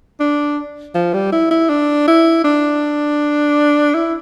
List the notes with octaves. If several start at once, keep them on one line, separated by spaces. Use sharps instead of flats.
D4
F3
G3
E4
E4
D4
E4
D4
E4